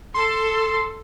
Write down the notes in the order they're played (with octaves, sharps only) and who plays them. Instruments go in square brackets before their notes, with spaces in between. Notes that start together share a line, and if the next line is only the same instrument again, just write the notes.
[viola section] A4 [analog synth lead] C6